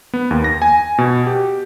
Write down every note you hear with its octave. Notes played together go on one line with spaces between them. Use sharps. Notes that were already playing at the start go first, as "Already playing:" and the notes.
B3
D#2
A#6
G#5
B2
G4